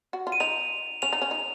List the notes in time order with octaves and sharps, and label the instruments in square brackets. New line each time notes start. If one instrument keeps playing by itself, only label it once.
[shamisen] F#4
F4
[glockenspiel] D#7
[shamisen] D#4 [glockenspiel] F7
[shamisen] C#4 [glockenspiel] F7
[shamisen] D#4
C#4
D#4